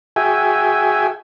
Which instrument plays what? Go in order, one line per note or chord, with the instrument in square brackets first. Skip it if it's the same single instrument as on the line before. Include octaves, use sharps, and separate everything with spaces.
[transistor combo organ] F#4 G#4 E5 G5 G#5